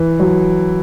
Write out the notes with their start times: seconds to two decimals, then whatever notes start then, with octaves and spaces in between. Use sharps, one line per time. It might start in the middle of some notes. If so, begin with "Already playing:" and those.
Already playing: E3
0.20 F#3